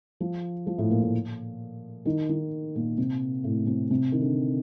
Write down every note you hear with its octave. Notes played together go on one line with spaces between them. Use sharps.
F3
F3
A2
A#2
A2
D#3
D#3
A#2
C3
A2
C3
C3
D#3
D3